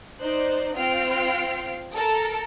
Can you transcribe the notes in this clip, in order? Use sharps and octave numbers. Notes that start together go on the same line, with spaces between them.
D#4 C5 D5 F#6
C4 F4 G5 F6 C7 D7
A4 A#4